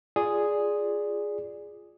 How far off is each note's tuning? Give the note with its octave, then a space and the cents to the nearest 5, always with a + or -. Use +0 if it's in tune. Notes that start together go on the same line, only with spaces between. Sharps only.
F4 +0 G#4 +0 D5 +0